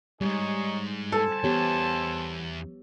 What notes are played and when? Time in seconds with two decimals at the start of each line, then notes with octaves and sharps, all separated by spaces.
0.21 D2 G#2 G3 D#4 G#4 C#5
1.12 A4 C5 G#5 A5
1.44 E2 B3 G4 C#5